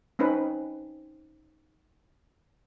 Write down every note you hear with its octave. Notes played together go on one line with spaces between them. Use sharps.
C4 C#4 D#4 B4